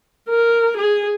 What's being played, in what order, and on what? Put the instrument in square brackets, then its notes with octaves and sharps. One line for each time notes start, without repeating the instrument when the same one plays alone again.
[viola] A#4
G#4